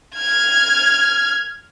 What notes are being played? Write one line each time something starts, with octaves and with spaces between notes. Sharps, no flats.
F6 G#6